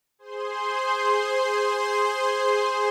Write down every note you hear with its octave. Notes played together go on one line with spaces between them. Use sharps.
G#4 C5 C6